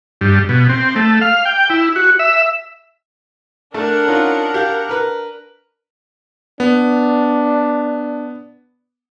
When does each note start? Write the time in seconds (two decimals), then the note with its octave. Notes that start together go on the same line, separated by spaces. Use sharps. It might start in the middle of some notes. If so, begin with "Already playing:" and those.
0.21 G2
0.49 B2
0.69 C4
0.96 A3
1.21 F5
1.45 G5
1.70 E4
1.96 F#4
2.19 E5
3.74 A3 D4 A#4 F#5
4.08 C#4 D#4 F4
4.54 G4 F5
4.89 A#4 B4
6.60 B3 D4